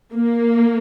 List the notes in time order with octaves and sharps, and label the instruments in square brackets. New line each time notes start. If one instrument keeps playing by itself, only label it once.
[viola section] A#3